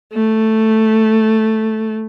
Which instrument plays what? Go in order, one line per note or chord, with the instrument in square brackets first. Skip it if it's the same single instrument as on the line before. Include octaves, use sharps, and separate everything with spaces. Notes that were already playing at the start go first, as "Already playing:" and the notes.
[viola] A3